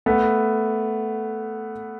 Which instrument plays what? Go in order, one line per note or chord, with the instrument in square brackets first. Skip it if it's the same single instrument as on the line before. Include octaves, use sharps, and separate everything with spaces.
[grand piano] A3 B3